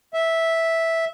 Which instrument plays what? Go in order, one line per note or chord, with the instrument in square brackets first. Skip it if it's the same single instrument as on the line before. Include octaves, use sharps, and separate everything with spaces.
[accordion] E5